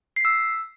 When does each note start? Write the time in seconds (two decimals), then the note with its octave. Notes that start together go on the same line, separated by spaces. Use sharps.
0.16 C7
0.21 B6
0.25 E6